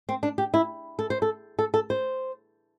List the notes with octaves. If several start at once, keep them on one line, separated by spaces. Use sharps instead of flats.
C4
D4
G4
E4
A4
C5
A4
A4
A4
C5